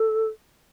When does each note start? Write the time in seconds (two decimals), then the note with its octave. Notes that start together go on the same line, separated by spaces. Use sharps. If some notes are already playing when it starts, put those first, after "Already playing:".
Already playing: A4